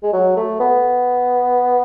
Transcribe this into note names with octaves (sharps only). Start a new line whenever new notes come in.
G#3
F#3
A3
B3